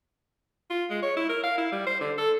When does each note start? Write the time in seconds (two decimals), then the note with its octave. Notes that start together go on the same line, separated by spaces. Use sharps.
0.70 F4
0.90 G#3
1.02 C#5
1.16 E4
1.29 A#4
1.43 F5
1.58 E4
1.72 G3
1.86 C5
2.01 D3
2.18 A4